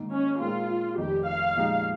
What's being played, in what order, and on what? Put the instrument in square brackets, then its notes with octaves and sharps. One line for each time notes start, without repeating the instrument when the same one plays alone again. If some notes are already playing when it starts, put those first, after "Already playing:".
Already playing: [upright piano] G#2 D#3 A#3 D#4
[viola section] C#4
[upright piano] A#2 G#3 C4 D#4 A#4 [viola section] F4
[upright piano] F1 F2 D#3 [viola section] G4
[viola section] F5
[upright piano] A#2 F3 G#3 D#4 G4